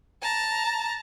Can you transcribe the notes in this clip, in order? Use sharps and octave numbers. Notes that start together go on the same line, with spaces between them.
A5 A#5